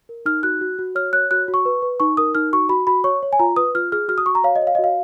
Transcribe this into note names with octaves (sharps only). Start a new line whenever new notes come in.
A#4
D#4 F6
F#4 F#6
F#4
F#4
C#5 F6
C#5 F#6
F#4 F#6
F#4
C#6
B4
B4
D#4 C#6
A#4 D#6
D#4 F6
F#4 C#6
F#4 B5
F#4 B5
C#5 C#6
C#5
G#5
F4 A#5
B4 D#6
F4 F6
G#4 F6
F#4 F6
D#6
F#4 C#6
A#5
C#5 F5
D#5
C#5
F5
D#5
F#4
F5